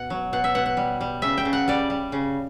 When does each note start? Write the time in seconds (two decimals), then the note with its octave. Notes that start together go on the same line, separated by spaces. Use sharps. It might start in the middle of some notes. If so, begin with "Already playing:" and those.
Already playing: B2 F#5
0.10 F#3
0.33 B2 F#5
0.44 E5
0.55 B2 F#5
0.66 F#5
0.77 G3
1.01 G3
1.22 C#3 E5
1.38 G5
1.45 C#3
1.53 F#5
1.68 G3 D5
1.90 G3
2.12 C#3